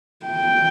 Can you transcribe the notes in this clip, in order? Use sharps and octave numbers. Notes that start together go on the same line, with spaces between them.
G5